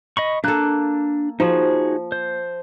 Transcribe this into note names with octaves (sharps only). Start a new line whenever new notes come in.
D#5 B5 C#6
A#3 D4 A4 F#6
F3 D#4 F#4 G#4
C5